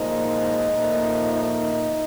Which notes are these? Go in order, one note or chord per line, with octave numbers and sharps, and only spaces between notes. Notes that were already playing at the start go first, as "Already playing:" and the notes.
Already playing: A#2 F3 G#3 D#4
A#2 F3 A3
D#4